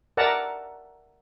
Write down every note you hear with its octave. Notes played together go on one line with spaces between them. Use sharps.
A#4 D5 E5 F#5 A5 A#5